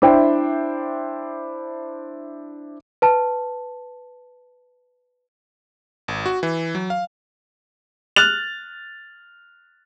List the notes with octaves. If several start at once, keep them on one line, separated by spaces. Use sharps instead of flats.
D4 E4 C5 E5 G5
B4 A5
G#1
F#4
E3
F#3
F5
F6 F#6 A6 F7